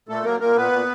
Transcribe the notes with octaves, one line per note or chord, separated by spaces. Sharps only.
A#2 A3 A4
F#3 A#3 A#4
A#2 A#3 A#4
A#2 B3 B4
A#2